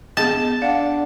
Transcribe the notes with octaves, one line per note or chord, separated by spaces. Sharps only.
B3 G#4 D#5 A5
D4 F5 F#5